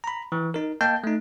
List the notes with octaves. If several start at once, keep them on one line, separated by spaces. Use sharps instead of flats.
A#5 B5
E3
D#4 A#4
A#3 D#5 G5 A5 G6
A3 D#4